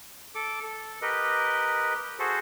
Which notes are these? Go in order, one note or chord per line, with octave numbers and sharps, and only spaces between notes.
A4 D6
A4
G4 A#4 B4 D#5
F#4 G#4 A4 C5